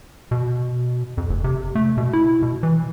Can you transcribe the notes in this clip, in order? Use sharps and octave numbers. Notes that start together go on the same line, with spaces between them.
B2
F2
F1
C3
A3
B2
E4
B2
E3